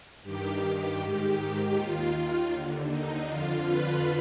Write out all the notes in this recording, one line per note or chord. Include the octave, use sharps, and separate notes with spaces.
G2 D#3 G4
G#2 D#3 G4
D#2 D#3 F4
D#2 D3
D#4
F2 D3 F4
B4